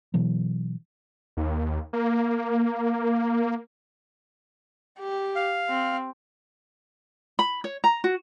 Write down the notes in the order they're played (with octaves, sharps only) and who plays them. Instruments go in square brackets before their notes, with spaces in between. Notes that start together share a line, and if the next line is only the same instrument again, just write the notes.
[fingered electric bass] B2 E3 F#3
[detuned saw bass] D#2
A#3
[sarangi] G4
[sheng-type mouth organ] F5
[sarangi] C4
[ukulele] B5
C#5
A#5
F#4